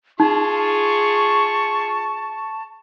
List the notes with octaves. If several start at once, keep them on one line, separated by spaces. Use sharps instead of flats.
D#4 F4 G#4 A5 C#6